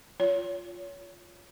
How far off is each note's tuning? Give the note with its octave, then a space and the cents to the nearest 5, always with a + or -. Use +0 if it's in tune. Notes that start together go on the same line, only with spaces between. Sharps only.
F4 +0 C#5 +25